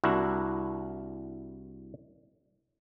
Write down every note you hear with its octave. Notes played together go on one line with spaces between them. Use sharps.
C2 D4 E4 F#4 A#4